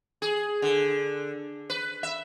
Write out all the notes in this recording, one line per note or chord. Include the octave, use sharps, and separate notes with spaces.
G#4
D3
B4
E5